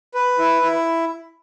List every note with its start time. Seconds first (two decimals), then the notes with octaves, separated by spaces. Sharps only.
0.15 B4
0.39 E4
0.62 E4